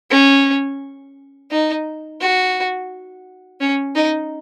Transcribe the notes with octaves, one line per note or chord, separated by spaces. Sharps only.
C#4
D#4
F#4
C#4
D#4